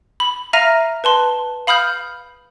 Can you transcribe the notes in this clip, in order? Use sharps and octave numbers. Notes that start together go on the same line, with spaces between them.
B5
E5 F5 A#5 F6 A#6 D#7
B4 A5 C6
F5 B5 D#6 F6 G6